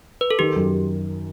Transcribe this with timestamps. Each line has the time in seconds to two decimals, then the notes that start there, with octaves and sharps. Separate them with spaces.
0.21 B4
0.31 A4
0.39 D#3 G4
0.56 F#2